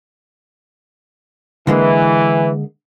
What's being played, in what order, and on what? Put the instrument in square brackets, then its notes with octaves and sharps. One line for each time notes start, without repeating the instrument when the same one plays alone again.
[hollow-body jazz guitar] D3 G#3 A#3 [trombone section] E3